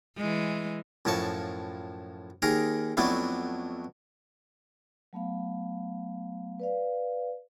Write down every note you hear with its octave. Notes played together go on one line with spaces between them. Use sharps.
E3 G#3
F#2 A2 F3 A5 C#6
D#2 D#3 G#4 A#4 A#5
F2 F#3 A3 B3 D4 E4
F#3 A3 B3 F5
B4 D5 F5